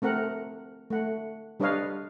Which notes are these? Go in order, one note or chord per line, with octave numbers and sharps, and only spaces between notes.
A3 C4 A#4 F#5
A3 F#5
G3 D4 B4 C#5 D#5 F5